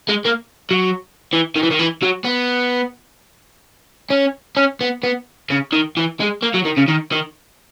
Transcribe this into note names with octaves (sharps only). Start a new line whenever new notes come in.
G#3
A#3
F#3
E3
D#3
E3
D#3
E3
F#3
B3
C#4
C#4
B3
B3
C#3
D#3
E3
G#3
A#3
F#3
D#3
C#3
D#3
D#3